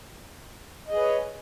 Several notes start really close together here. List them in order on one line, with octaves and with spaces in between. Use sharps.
D#5 G#4 B4 C#5